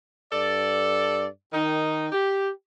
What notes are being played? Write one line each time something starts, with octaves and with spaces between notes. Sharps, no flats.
G2 A4 D5
D#3 D#4
G4